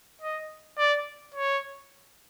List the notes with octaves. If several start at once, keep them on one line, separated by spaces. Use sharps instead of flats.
D#5
D5
C#5